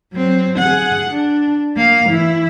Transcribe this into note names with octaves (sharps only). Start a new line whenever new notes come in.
F#3 C4
G#4 F#5
D4
A#3 F5
E3 E4